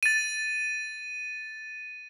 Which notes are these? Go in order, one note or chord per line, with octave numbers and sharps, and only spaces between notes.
A6 D#7